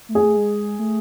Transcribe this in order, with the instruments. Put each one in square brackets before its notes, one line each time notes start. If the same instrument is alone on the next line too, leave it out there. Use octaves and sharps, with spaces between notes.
[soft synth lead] A3
[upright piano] G#4
[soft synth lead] A3
G#3
A3